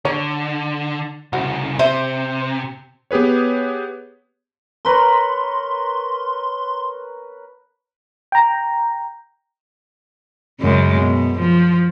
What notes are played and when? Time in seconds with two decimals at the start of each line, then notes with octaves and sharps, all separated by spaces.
0.05 D3 C#5
1.33 C2 C#3 F#4 C5
1.79 C3 C5 E5
3.11 B3 G4 G#4 B4 C#5
4.85 A#4 B4 C#5 C6
8.32 G5 A#5
10.61 F#2 C#3 G#3
10.99 B2
11.40 F3